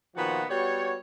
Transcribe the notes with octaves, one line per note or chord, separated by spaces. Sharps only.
A#2 D#3 F3 B3 F#4
G3 B3 F#4 C#5